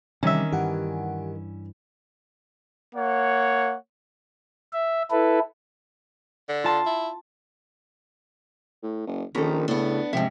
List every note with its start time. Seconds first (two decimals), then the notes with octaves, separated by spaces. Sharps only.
0.23 C3 D#3 E3 G3 C4 C#4 E5
0.52 G2 E3 G4 F#5 G#5
2.94 A#3 C#5 F#5
4.73 E5
5.11 E4 A4 B4
6.49 D3
6.64 F4 A5 C6
6.86 E4
8.83 A2
9.07 F#1
9.35 A#1 D#3 C#4 A4 A#5
9.68 A2 C#3 B3 D4
10.13 D#1 G#2 C3 F3 E5 G5